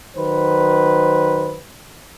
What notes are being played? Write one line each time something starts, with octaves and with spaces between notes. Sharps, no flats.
D#3 F#3 B4 C5